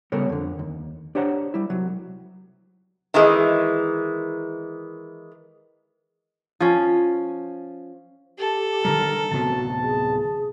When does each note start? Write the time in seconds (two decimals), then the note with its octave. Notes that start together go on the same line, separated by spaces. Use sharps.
0.12 C#3 G3 B3 A4 A#4 C#5
0.29 F2 D3
0.59 D#2
1.15 D4 G4 C5 C#5 F#5 A#5
1.54 G3 E4
1.70 C2 F#3
3.14 D#3 E3 G#3
6.60 F3 C#4
8.39 G4 A4
8.85 D3 D#3 G3 A#4
9.31 D1 C3 B3 F#4 A5
9.82 G#4